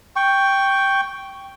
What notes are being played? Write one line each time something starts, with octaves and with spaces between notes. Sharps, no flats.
G5 C#6